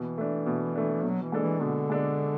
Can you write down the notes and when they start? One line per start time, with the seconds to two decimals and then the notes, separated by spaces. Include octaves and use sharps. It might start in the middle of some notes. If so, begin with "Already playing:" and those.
Already playing: B2 E3
0.18 A3 D4
0.46 B2
0.75 A3 D4
1.03 B2 F#3
1.22 E3
1.32 G#3 D4 A4
1.42 E3
1.61 B2 D3
1.90 G#3 D4 A4